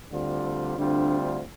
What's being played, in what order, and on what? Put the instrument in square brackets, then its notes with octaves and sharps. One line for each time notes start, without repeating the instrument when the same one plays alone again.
[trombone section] D2 D3 G3 C4 F4
[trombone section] D2 D3 G3 C4 F4 [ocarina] D4